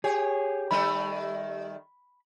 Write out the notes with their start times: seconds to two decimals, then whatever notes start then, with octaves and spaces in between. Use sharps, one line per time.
0.04 G4 G#4 C#5
0.71 D#3 G3 A3 B5